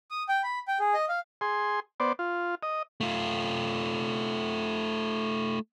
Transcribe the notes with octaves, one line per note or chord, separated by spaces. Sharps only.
D#6
G5
B5
G5
G#4
D#5
F5
G#4 C6
B3 C5 D5
F4
D#5
A3 F4